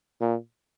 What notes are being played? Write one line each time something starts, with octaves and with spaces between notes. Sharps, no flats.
A#2